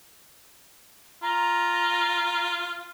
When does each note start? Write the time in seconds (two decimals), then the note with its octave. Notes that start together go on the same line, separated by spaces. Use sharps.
1.22 F4 A#5